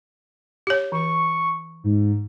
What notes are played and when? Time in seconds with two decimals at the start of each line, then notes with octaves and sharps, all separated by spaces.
0.67 G4 C#5
0.92 E3 C#6
1.84 G#2